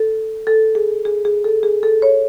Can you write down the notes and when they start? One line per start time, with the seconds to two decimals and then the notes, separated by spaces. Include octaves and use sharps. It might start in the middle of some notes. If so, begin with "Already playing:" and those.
Already playing: A4
0.47 A4
0.75 G#4
1.05 G#4
1.25 G#4
1.44 A4
1.63 G#4
1.83 A4
2.02 C#5